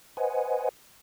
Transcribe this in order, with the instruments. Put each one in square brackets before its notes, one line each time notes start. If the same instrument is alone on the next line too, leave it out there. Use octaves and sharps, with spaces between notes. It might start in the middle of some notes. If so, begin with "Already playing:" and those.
[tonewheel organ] B4 C5 D#5 F#5 G#5